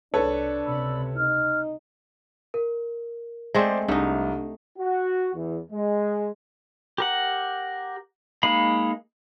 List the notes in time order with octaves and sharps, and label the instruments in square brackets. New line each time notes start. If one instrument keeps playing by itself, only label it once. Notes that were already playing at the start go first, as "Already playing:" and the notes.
[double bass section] C2 [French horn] D4 [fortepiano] A4 B4 C#5
[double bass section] C#2 C3 [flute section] D5 B5 E6
[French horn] D#4 [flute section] F6
[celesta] A#4
[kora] G#3 A3 C4 [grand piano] C5 D5 C6
[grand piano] C2 [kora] A3 D#4 [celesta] D4
[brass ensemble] F#4
E2
G#3
[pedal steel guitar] G4 A#4 F#5
G#3 A#3 D#4 F5 B5